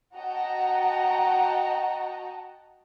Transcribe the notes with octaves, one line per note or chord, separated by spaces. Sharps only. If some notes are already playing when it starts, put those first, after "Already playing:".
F#4 D#5 F#5 G5 A5 A#5